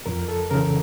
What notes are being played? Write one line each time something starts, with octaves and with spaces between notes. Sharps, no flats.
F2 A#4
A4
C#3 E3 A#4